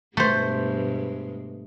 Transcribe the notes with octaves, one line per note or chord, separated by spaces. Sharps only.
G2 B2 G#3 A3 C5